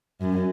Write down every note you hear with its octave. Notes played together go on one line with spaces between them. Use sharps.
F#2